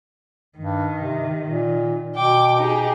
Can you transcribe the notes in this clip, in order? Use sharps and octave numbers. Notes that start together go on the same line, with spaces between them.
G2 D#3
C3
A#2
B2 G5 D6
D#4 G4 G#4